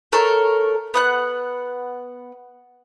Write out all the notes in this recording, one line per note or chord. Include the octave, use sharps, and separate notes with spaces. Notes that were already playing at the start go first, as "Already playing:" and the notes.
A3 A4 A#4 C#5
B3 F#5 F#6